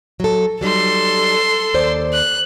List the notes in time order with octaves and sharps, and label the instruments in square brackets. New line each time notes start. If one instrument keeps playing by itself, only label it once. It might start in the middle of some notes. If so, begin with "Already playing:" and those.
[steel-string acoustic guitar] F#3 A4
[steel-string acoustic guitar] F#3 G3 D#4 [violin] A4 C6
[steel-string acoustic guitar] D#2 C5 D5
[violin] F#6